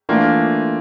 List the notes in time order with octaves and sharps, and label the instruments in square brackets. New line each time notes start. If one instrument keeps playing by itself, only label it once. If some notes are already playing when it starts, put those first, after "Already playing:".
[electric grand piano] E3 A3 D4 F4 [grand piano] A#3